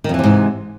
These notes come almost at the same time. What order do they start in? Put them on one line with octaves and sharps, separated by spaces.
D#3 F2 E3 C3 G#2